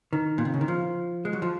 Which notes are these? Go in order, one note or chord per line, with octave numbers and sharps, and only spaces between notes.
D#3
A#2
C3
C#3
D#3
F3
G#3
F#3
F3